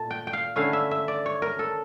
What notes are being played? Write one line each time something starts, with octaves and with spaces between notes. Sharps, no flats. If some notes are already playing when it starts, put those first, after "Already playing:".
Already playing: A#2 A3 A5
G5
G5
F5
D3 A3 C#4 E4 F5
E5
E5
D5
C#5
A#4
A4